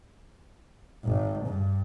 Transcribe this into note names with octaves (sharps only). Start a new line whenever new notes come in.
G#1
G2